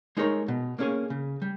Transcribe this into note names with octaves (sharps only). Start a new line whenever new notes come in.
G#3 D#4 A#4 C#5
B2
A#3 C#4 G#4 C#5
C#3
G3